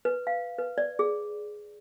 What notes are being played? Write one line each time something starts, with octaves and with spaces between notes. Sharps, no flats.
B4
F5
B4
D5
G#4